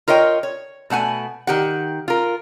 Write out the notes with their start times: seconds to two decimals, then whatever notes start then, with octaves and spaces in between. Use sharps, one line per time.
0.08 F4 A#4 C#5 D#5 G5
0.43 C#5
0.90 B2 A3 F#5 G#5
1.47 D#3 G4 F#5
2.08 F4 A#4